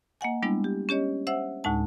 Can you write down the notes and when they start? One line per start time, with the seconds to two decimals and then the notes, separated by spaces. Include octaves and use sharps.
0.21 A#3 D#5 F#5 G#5
0.43 G3 G#3 B3 D4 E4
0.64 G4
0.89 C#4 G4 C#5 D#5
1.27 C5 E5 F#5 E6
1.64 D2 A2 G#3 D#4 A5